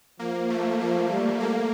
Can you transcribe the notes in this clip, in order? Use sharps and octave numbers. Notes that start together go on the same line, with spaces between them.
F3 A#3
A3
F3 A#3
G3
A3 A#3